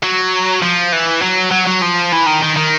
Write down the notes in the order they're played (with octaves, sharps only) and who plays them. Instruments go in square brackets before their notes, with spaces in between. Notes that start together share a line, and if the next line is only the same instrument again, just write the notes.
[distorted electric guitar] F#3
F3
E3
F#3
F#3
F#3
F3
E3
D#3
D#3
D#3